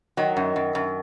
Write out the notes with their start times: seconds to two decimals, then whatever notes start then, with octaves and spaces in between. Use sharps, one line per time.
0.17 D#3 F#3
0.37 F#2
0.56 F#2
0.75 F#2